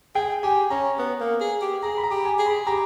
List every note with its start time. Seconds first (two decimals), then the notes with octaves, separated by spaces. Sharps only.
0.15 G#4 G5
0.43 G4 G#5
0.70 C#4 A#5
0.99 B3
1.20 A#3
1.40 G#4
1.62 G4
1.83 G#4 A#5
1.98 B5
2.03 A#5
2.11 G4
2.25 G#5
2.39 G#4
2.46 B5
2.66 G4 A#5